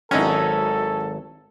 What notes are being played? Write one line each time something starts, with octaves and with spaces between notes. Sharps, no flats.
G#1 F#3 C#4 D#4 E4 A4